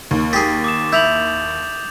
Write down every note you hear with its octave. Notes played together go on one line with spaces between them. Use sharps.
D#2
G4 G#4 A6
D6 D#6 E7
E4 G6 F7 F#7